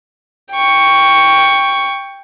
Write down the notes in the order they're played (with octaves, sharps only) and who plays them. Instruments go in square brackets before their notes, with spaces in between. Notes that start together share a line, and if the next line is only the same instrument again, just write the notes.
[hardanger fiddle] G5 C#6